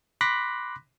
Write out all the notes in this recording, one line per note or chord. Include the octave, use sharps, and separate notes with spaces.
B5 C6 D6 F#6 A#6 B6